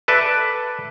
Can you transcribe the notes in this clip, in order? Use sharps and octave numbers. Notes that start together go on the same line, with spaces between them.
A4 B4 D5 E5